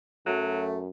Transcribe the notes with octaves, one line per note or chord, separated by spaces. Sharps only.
F#2 F#3 A3